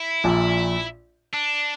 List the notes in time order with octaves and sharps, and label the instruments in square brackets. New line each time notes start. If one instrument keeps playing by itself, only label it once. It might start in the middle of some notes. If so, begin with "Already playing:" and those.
Already playing: [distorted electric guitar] E4
[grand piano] A#1 A#2
[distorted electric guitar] D4